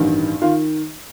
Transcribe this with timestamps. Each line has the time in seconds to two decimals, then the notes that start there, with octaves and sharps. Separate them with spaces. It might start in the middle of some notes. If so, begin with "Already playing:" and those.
Already playing: A1 G2 D#3
0.42 D#3 F4